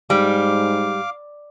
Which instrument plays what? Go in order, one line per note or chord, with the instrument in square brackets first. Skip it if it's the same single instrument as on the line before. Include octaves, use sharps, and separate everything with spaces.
[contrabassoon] G#2 [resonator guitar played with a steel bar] G3 [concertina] F5 D6